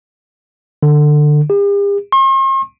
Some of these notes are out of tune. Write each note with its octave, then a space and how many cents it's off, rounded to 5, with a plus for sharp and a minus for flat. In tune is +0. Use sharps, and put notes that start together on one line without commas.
D3 +20
G4 +45
C6 +45